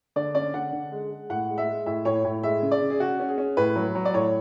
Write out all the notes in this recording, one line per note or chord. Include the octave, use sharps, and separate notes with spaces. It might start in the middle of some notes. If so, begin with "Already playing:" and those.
D3 D5
C#4 D5
D3 F#5
D3
G#3
G#3
A2 F#5
G#3
E5
G#3
A2 E5
A2 C#5
A2
G#3 E5
C#3
D5
C#3
G#4
C#3 F#4
C#4
G#4
C#4
A2 B4
F#3
F#3
D5
A2 C#5